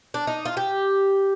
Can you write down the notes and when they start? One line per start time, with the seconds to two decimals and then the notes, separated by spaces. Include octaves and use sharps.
0.14 D4
0.27 D#4
0.45 F4
0.57 G4